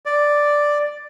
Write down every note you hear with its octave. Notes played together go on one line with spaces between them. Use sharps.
D5